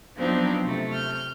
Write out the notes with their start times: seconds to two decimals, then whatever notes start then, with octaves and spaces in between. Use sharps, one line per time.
0.17 F3 F#3 B3 C4 D4 D#4
0.63 C3 A3
0.92 F6 G6